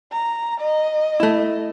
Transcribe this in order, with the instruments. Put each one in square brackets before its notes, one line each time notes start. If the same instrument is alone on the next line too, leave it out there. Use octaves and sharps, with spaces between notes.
[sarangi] A#5
D#5
[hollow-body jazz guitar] A3 E4